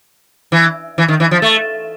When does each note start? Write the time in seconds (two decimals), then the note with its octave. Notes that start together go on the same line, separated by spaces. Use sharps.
0.52 E3
0.98 E3
1.08 D#3
1.20 E3
1.31 F3
1.42 A3